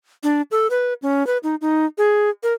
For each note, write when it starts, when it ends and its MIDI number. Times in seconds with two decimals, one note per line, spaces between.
0.23 0.42 62
0.51 0.67 69
0.70 0.93 71
1.02 1.26 61
1.27 1.38 71
1.43 1.55 63
1.61 1.85 63
1.98 2.30 68
2.43 2.53 70